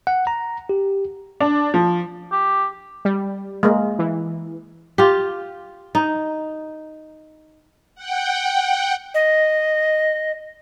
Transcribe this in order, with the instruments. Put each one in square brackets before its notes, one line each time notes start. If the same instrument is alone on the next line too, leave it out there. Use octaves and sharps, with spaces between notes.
[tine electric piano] F#5
A#5
G4
[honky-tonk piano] D4
F3
[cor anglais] G4
[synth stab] G3
[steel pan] G#3 A#3
[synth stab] E3
[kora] F4 G4
D#4
[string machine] F#5 G5
[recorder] D#5